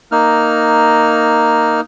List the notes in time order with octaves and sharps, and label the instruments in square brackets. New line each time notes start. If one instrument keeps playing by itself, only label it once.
[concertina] A#3 D#4 F6